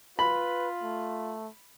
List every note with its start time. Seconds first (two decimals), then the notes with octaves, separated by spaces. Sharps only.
0.19 F4 B4 B5
0.83 A3